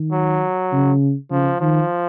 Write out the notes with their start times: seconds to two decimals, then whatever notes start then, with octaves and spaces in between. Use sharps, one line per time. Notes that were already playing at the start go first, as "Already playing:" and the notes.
Already playing: D#3
0.12 F#3
0.72 C#3
1.31 C#3 F3
1.61 D#3 F3